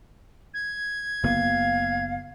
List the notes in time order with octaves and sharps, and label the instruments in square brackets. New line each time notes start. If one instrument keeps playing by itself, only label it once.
[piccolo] G#6
[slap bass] F#1 A#3 B3 [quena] F5